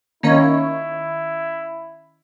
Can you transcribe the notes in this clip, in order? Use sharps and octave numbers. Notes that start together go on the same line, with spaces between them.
D#3 A#3 C#4 D#4 E4 C#5